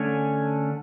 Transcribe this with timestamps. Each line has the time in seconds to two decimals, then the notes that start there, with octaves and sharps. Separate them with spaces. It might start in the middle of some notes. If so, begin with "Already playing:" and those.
Already playing: D3 A3 C#4 G#5